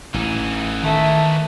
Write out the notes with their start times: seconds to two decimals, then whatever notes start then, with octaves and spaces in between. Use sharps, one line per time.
0.14 A1 E3 D#4
0.83 D#3 A3